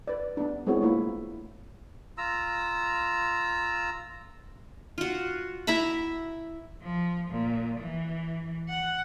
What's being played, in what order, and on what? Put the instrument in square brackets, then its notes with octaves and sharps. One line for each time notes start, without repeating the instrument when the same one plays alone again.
[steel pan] B4 D5
B3 D4
G#3 B3 C4 E4 F#4 C#5
A3 A#3 E4 F4 C#5
[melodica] F4 A#5 E6
[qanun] F4 F#4
E4 E5 A#5 B5
[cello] F3
A#2
E3
F#5